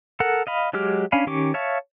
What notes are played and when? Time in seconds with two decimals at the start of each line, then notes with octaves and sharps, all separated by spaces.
0.20 A4 A#4 F#5
0.47 D#5 F5 B5
0.73 F#3 G#3 G4 D6 F6
1.12 C#4 D4 F5 G#5 B5
1.27 D#3 C#4 G4 C#6 D6
1.54 C#5 E5 F5 A5 C#6